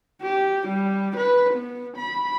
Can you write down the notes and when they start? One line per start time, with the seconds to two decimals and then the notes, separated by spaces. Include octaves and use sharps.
0.22 G4
0.68 G3
1.17 B4
1.55 B3
1.97 B5